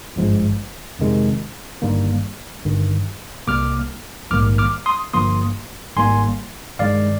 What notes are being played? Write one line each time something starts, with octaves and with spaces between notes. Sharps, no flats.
G#1 G2 F3 G#3
F2 C3 D#3 G#3
G1 G2 D#3 G3 A#3
G1 G2 D#3
C2 C3 G3 A#3 D6 F6
A#1 G#2 D#3 G3 A#3 D6 F6
D6 F6
C6 D#6
G1 G2 F3 A#3 C6 D#6
G#1 G#2 G3 A#3 G#5 C6
G2 D#3 G#3 D5 F5